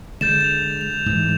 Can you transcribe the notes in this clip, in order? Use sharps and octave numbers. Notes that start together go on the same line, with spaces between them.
D3 G#3 G6 A6 E7
A6 F7
F7
G#2 E3